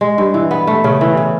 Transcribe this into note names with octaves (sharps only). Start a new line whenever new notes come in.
G#3
G2
E3
B3
A3
C#3
E3
C#3